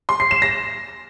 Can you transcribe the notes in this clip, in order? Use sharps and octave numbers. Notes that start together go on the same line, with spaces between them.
C6
C7
E7
A#6